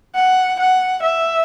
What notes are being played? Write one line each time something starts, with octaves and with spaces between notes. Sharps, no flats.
F#5
F#5
E5